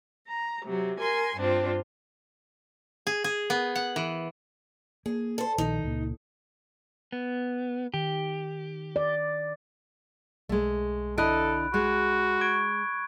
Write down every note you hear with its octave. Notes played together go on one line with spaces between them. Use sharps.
A#5
C3 F#3
A#4 G#5 C6
G2 C4 D4 F4
G#4
G#4
B3
F#5
E3
A#3 G#4
A4 C5
A#1 D#3 D#4
C#2 A#2
B3
D#3 G4
D5
B1 G#3 A3
D3 E4 A4 D#5 B5 F#6 D7
G#3 F#4 F#6
C#6 G#6 D7